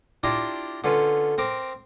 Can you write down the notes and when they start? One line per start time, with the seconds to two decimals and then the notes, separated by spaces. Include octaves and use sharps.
0.23 D4 E4 F4 G4 A#5
0.84 D3 C#4 F4 B4
1.38 C4 A#4 D6